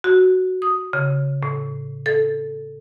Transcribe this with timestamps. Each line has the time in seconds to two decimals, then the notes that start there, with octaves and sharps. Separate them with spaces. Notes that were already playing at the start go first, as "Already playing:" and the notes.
0.04 F#4
0.62 D#6
0.93 C#3
1.43 A2
2.06 A4